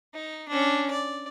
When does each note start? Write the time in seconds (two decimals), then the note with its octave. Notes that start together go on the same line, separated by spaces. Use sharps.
0.15 D#4
0.49 C#4 D4
0.91 D5